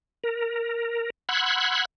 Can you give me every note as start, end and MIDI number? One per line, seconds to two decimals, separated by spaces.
0.24 1.10 70
1.29 1.85 78
1.29 1.85 83
1.29 1.85 84
1.29 1.85 88
1.29 1.85 90
1.29 1.85 92